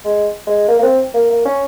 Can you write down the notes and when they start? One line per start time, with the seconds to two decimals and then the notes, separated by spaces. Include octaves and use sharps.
0.05 G#3
0.47 G#3
0.68 A#3
0.79 A#3
0.83 C4
1.15 A#3
1.30 A#3
1.46 C#4